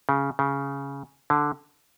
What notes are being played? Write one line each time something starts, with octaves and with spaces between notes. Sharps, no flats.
C#3
C#3
D3